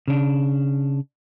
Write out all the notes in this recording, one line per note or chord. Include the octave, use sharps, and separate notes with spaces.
C#3 D4